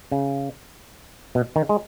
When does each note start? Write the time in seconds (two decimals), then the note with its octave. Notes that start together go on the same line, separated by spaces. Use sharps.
0.12 C#3
1.35 B2
1.56 D#3
1.69 G#3